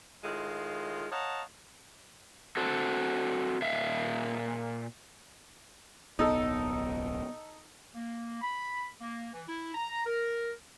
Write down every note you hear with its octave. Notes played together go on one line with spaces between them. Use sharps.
A2 D#3 G#3 F4
C#5 D#5 F5 F#5 A5 A#5
C4 F#4 A4
A#2 E5 F5
D1 B1 B3 D#4 A4
A#3
B5
A#3
E3
E4
A#5
A#4